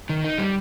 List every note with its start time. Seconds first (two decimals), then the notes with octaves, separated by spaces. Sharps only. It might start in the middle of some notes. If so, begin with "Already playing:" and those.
0.09 D#3
0.24 D#4
0.38 G3